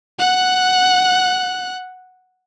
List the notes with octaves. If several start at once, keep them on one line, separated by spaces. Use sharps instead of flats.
F#5 F#6